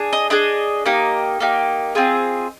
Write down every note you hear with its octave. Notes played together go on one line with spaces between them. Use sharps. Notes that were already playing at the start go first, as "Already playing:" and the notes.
Already playing: D4 G#4
D#5
D4 G#4 D#5
A#3 D#4 G4
A#3 D#4 G4
C4 F4 G#4